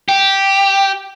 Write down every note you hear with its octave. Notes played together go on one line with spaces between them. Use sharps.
G4